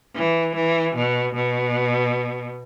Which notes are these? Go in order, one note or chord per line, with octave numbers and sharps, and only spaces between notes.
E3
E3
B2
B2